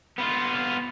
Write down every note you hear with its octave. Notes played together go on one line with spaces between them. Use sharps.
B3 F4